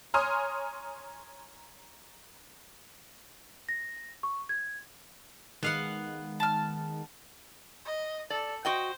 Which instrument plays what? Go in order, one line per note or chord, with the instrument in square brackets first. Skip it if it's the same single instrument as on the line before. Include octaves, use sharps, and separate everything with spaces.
[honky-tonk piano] C#5 G#5 A#5 C6 D#6 F6
[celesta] A#6
C#6
G#6
[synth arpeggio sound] D#3 G#3 [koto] B3 F5 F#5
[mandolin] A5 F6
[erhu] D#5
[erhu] A4 [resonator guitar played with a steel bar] D5
[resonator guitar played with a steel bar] F#4 D#5 G5 [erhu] C5